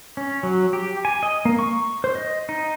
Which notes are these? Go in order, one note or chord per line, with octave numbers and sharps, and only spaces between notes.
C#4
F#3
G4
G#5
D#5
A#3
C#6
C5
D#5
D#4